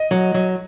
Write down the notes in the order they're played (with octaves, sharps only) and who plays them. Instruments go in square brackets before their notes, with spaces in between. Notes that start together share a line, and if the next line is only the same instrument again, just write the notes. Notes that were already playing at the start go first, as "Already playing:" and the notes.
Already playing: [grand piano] D#5
[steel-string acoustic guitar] F#3
F#3